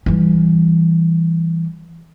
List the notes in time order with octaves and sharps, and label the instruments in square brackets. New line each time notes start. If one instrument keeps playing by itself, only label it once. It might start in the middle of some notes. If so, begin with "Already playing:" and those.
[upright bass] E3 G3